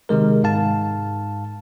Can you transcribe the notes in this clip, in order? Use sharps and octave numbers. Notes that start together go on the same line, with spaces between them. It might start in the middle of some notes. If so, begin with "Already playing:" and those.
C3 D#3 G#3 A#4
G#2 F5 A5